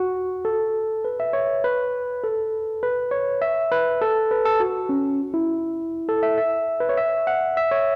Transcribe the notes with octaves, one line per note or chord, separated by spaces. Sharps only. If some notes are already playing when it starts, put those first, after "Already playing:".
Already playing: F#4
A4
B4
E5
C#5
B4
A4
B4
C#5
E5
B4
A4
B4
A4
F#4
C#4
E4
A4
E5
E5
B4
C#5
E5
F#5
E5
C#5